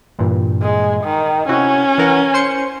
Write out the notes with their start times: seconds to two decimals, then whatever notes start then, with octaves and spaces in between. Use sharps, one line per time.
0.19 G2 A#2 E3
0.62 G#3
1.04 D#3
1.49 C3 C#4 E4 F#4
1.98 E3 A#4 F#5
2.34 C5 C6 C#7